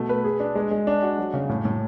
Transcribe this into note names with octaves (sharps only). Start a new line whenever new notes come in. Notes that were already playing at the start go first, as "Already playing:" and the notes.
Already playing: B2 A3
B4
G#4
D4
G#3
G#3
D4
F#4
F#3
C#3
A2
A2